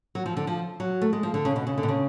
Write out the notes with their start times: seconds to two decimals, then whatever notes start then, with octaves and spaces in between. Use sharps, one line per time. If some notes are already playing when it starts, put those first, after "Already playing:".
0.15 F#3
0.26 F3
0.37 D3
0.47 F3
0.80 F#3
1.02 A3
1.13 G#3
1.23 F3
1.34 D3
1.45 C#3
1.56 B2
1.67 C#3
1.78 D3
1.83 B2
1.88 C#3